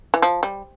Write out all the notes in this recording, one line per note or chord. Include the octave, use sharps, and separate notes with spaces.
E3
F3
G3